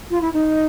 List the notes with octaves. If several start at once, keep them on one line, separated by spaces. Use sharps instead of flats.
F4
E4
D#4